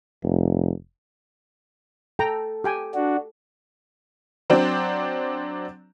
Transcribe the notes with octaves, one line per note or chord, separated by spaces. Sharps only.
F1
A4 G5 A#5
G4 G5 G#5
D4 F#4
F#3 C4 D4 C5